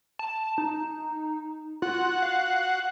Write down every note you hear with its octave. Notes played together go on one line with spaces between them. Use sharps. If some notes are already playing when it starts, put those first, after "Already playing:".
A5
D#4
F4 F#4 F#5
F5